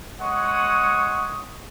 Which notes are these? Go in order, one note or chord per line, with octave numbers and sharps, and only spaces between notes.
G#3 C#5 F#5 C#6 D#6